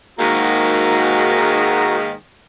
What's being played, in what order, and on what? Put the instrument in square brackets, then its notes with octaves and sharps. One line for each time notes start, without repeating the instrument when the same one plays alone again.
[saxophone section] G#2 D#3 [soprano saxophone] A#3 [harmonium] F#4 A#5